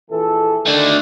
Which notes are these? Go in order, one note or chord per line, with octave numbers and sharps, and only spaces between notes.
A#1 E3 A4
D#3 A3 D4